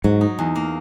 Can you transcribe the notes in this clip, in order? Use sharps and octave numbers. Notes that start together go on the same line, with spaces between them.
G#2 F#3
D#4
E2
A#3